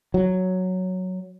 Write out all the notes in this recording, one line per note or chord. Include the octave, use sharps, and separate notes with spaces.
F#3